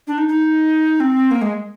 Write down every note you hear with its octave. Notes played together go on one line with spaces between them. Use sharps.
D4
D#4
D#4
C4
A#3
G#3